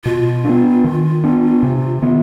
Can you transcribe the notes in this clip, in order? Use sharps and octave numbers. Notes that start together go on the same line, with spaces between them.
B2 F4
B3 D4
D#3
B3 D4
C3
D#3 B3